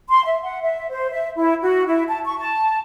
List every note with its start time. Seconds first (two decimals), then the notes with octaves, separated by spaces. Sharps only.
0.10 C6
0.24 E5
0.43 F#5
0.62 E5
0.90 C5
1.11 E5
1.37 E4
1.61 F#4
1.87 E4
2.08 A5
2.25 C#6
2.39 A5